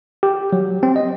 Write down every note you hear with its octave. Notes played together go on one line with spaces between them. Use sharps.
G4
F#3
C4
D#5